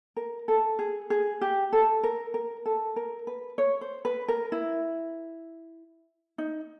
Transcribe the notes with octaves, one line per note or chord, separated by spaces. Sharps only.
A#4
A4
G#4
G#4
G4
A4
A#4
A#4
A4
A#4
B4
C#5
C5
B4
A#4
E4
D#4